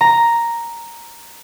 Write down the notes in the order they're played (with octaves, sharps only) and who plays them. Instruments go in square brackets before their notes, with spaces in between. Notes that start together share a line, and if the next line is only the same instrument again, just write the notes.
[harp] A#5